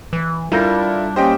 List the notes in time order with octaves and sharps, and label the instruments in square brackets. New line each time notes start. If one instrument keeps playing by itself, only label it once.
[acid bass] E3
[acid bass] G3 [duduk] D4 [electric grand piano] E4 A4 A#4 [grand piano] F4 G6 A#6
[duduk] A#3 [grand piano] C#4 G4 [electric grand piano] C5 D#5 G5